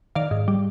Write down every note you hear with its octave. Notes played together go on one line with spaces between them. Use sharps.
D#3 D5 F5
G#2
G3